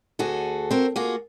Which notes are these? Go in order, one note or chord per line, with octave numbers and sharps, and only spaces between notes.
D2 F#4 G#4 A4
C4 F#4 A#4
A#3 F4 F#4 G#4